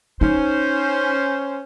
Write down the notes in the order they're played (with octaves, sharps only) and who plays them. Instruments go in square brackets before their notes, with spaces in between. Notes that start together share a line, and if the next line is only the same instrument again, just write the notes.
[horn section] C#4 C5 [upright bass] D#4